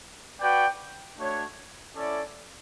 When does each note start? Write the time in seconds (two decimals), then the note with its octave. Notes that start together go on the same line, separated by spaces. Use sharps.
0.39 F#4 B4 D5 G5
1.17 A3 D4 F#4 C#5
1.95 C#4 E4 A4 D5